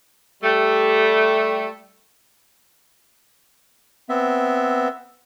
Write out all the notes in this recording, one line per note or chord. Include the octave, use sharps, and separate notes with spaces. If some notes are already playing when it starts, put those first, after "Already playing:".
G3 A3
B3 C4 E5